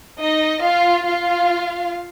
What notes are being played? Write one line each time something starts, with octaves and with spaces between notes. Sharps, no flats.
D#4 D#5
F4 F5
F4 F5